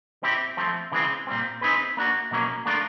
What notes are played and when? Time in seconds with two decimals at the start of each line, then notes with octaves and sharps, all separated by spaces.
0.23 C4 E4 G4
0.57 F3 A3 C4
0.92 C#3 E3 G#3 C4
1.27 A#2 G3 C4
1.61 C4 D#4 G#4 B4
1.97 A#3 D4 F#4
2.31 B2 F#3 A#3 C#4
2.66 A3 D4 F4 A#4